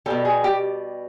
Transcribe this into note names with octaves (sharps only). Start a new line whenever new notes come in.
B2 G3 A4
G#4
G4